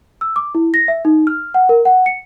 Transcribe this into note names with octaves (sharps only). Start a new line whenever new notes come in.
E6
D6
E4
A#6
E5
D#4
F6
F#5
A#4
F#5
C#7